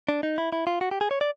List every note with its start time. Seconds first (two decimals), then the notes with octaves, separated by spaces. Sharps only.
0.09 D4
0.23 D#4
0.38 E4
0.52 E4
0.67 F4
0.81 F#4
0.91 G4
1.01 G#4
1.11 C#5
1.21 D5